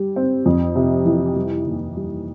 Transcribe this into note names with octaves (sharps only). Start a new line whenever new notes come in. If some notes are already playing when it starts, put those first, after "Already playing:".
Already playing: G3
C4
F2
C3
E3
G3
D#2
G3